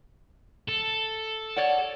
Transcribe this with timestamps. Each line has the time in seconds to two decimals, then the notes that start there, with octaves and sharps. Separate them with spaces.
0.68 A4
1.56 C#5 D5 F#5